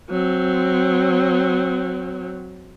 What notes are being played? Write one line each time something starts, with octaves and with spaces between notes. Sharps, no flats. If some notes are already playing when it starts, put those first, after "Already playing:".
F#3 C4